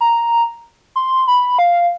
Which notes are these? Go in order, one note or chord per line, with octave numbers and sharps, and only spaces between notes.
A#5
C6
B5
F5